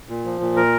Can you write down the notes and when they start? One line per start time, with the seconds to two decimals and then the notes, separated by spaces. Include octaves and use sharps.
0.09 A#2
0.25 F3
0.41 A#2
0.56 A#4